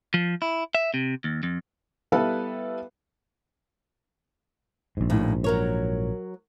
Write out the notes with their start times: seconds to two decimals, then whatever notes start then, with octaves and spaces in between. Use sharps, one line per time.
0.14 F3
0.42 E4
0.75 E5
0.94 C3
1.24 D#2
1.43 F2
2.12 G3 B3 E4 A4 B4 F5
4.97 A#1 G#2
5.10 D#2 A2
5.44 F#3 A#4 C#5